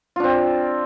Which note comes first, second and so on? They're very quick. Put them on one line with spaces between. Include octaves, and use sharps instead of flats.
F4 D4 C4